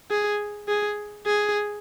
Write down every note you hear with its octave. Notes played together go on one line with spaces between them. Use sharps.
G#4
G#4
G#4